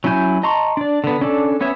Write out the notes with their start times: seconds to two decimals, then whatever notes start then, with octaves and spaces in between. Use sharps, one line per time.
0.04 F#3 C#4 E4 G#5 G6
0.43 D#5 A5 A#5 C6 C#6
0.77 D4 D5
1.04 D3 B3
1.21 C#4 D4 A4 D5
1.61 B3 C#4 C#5 E5